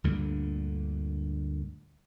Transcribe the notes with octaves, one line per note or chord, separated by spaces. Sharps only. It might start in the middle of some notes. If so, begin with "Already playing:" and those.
D2 G2 A#2 D3